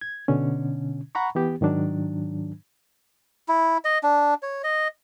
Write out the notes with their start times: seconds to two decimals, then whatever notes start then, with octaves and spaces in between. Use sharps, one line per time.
0.01 G#6
0.28 B2 D3 C#4
1.15 F#5 A#5 B5 C#6
1.35 E3 B3 G4
1.61 G#2 D#3 F#3 D4
3.48 E4
3.85 D#5
4.03 D4
4.43 C#5
4.64 D#5